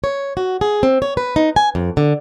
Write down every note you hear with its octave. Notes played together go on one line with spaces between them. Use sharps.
C#5
F#4
G#4
C4
C#5
B4
D#4
G#5
F2
D3